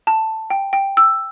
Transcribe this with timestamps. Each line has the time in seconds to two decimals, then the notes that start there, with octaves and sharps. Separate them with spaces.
0.07 A5
0.50 G5
0.73 G5
0.97 E6